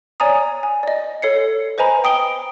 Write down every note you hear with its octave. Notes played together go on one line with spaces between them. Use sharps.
C#5 D5 G#5 A#5 D#6
G#5
D5 D#5
A4 C#5 C7 C#7
B4 C5 D#5 G#5 A#5 B5
G5 D#6 D7 G7